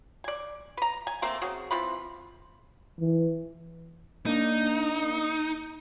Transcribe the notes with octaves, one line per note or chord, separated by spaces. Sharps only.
D5 G#5
B4 A#5
G#5
A3 A#3 C4
C#3 C4 F#4 G#4
E3 C4 F4 B5
E3
A#3 D4 D#4